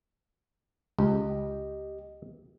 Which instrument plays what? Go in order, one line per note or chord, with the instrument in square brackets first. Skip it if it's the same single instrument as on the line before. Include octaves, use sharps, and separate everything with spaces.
[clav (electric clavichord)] C#2 [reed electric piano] G4 D#5